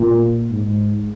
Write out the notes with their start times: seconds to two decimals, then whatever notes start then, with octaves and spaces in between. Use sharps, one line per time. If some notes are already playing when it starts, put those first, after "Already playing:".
Already playing: A#2
0.50 G#2